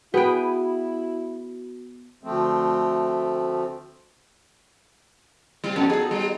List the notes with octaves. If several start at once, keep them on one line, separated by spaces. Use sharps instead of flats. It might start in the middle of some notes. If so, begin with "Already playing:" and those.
B3 E4 F#4 G#4 B4 G5
D2 F3 A3 C4
G3 C4 F4
F2 B3 A4
F#3 D#4 G#4
G3